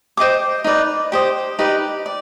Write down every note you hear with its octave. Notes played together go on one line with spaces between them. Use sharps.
C5 D#5 G5 D6
D#4 B4 D5
G4 C5 D#5
D#4 G4 B4 D5
D5